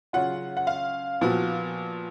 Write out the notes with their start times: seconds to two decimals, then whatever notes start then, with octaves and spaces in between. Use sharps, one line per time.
0.13 C#3 F#3 C#4 F4 F#5
0.57 F#5
0.67 F5
1.21 A#2 F3 B3 F#4